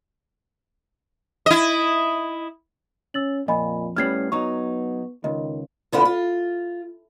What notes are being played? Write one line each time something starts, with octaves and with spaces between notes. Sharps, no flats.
E4 D#5
C#4 E6 A6 F#7
F2 A#2 D#5 G#5 B5
A2 G3 B3 C#4 F6 G#6 C7
F#3 B3 D#4 C#6
C#2 D#3 D#5
E2 D3 B3 E4 F4
F4